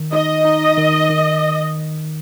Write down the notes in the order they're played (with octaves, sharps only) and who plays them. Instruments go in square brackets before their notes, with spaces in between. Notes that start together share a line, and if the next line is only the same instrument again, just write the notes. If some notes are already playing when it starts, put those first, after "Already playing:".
Already playing: [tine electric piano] D#3
[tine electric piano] D#4 [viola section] D#5
[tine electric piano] D#4
D#3
D#3